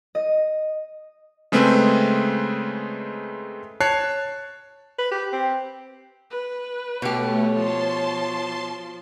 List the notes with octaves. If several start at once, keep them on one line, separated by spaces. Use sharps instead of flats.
D#5
C#3 G#3 A3 C4 B4
C#5 A5 F#6 C7
B4
G4
C4
B4
B2 A3 G4 C#5
F3 A5 C6